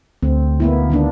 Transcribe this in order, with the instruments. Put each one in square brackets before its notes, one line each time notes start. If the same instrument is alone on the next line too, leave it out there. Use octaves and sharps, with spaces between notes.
[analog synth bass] D2 [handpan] C4
[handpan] A#3 B3 E4
D#3 A#3 D4